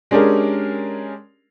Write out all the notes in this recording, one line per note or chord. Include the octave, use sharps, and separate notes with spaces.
G#3 C#4 D4 G4 G#4 A#4